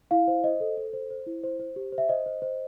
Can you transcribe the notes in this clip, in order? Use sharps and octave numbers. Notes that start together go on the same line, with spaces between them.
E4 F5
C5
C5 D#5
A4
A4
C5
C5
E4
C5
C5
G4
C5
E5
C5 D#5
C5
C5